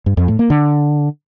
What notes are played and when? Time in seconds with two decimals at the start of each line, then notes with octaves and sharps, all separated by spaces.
0.06 G2
0.17 F2
0.28 A2
0.39 A#3
0.50 D3